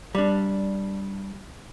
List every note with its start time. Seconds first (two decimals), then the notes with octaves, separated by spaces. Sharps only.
0.15 G3 D4